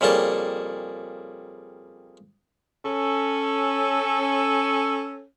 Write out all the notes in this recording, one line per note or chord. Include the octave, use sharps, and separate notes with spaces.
F2 C#3 G3 A#3 A5
C#4 A4